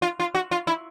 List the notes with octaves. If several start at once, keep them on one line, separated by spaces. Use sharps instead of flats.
F4
F4
F#4
F4
E4